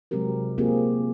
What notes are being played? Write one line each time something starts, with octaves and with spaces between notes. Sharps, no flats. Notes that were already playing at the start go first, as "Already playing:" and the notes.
C3 F#3 G#3 C4 G4 A#4
A#3 C4 F4 G4 G#4